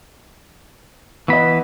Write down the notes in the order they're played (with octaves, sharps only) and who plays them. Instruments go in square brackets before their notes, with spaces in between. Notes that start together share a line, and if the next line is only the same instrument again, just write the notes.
[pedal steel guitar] E3 B5 [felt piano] B3 D#5